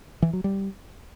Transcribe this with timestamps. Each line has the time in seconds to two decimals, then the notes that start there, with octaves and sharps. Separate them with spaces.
0.22 E3
0.33 F#3
0.44 G3